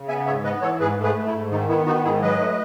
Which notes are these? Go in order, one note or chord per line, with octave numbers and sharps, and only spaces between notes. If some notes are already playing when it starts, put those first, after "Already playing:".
Already playing: C#3
B3 E5 G#5
G#2 C#5 E5
B3 B4 D#5
E3 A4 C#5
G#2 G#4 B4
A3
G#4 B4
A3
E4
G#2
D#3 D#4
B3 E4
D#3 D#4 F#4
G#2 E4 G#4
F#3 B4 D#5
A3